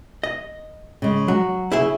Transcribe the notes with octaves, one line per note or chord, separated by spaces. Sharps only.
D#5
C#3 G#3
F#3 F#4
C#3 E4 G#4 E5